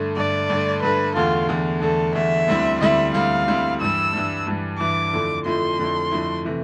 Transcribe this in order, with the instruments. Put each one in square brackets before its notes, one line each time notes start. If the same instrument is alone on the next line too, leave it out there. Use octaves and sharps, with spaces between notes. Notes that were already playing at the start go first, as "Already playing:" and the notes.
Already playing: [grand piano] G2 D3 A3
[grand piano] G2 D3 A3 [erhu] D5
[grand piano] G2 D3 A3
[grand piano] G2 D3 A3 [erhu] B4
[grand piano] E2 D3 A3 [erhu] F4
[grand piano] E2 D3 A3
[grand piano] E2 D3 A3 [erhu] A4
[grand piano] E2 D3 A3 [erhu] E5
[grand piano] D2 D3 G3 C4 E4
[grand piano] D2 D3 G3 C4 E4 [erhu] E5
[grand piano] D2 D3 G3 C4 E4 [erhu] F5
[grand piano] D2 D3 G3 C4 E4
[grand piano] G2 E3 G3 [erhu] E6
[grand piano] G2 E3 G3
G2 E3 G3
[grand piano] G2 E3 G3 [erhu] D6
[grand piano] F2 D3 F3 A3 E4
[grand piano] F2 D3 F3 A3 E4 [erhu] C6
[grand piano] F2 D3 F3 A3 E4
F2 D3 F3 A3 E4
C3 E3 A3